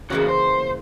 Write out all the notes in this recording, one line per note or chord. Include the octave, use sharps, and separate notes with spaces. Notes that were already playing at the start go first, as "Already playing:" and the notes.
A2 C#3 E3 A#3 F#4
C5